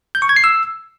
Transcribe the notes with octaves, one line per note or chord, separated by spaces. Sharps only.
G6
C#6
G#6
C7
E6